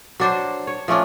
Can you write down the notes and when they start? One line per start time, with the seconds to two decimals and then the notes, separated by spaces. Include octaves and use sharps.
0.20 F#3 D4 C5
0.67 C#5
0.88 F3 A3 C#4 D4